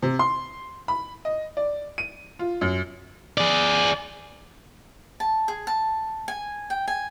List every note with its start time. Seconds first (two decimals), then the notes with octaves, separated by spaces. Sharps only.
0.03 C3
0.19 C6
0.88 B5
1.25 D#5
1.57 D5
1.98 D#7
2.39 F4
2.61 F#2
3.38 G#4 D5
5.20 A5
5.48 G#4
5.67 A5
6.28 G#5
6.70 G5
6.88 G#5